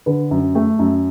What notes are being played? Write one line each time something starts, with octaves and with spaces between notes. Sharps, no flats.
D3 B4
F#2
A3
F#2